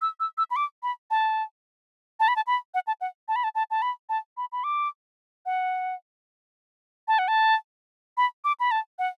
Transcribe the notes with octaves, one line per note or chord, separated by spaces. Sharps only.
E6
E6
E6
B5
D6
B5
A5
A5
B5
A5
B5
F#5
A5
F#5
A5
B5
A5
A5
A5
B5
A5
B5
B5
D6
F#5
A5
F#5
A5
B5
D6
B5
A5
F#5